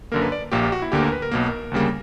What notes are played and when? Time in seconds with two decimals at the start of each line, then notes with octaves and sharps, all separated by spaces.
0.12 F#2 D3 A#3 A#4
0.22 B4
0.32 D5
0.52 A#1 A#2 A#3 G4
0.62 G4
0.72 F#4
0.82 E4
0.92 D2 D3 A#3 G4
1.03 A#4
1.12 B4
1.22 A#4
1.31 B1 B2 A#3
1.71 D2 C#3 G3 A#3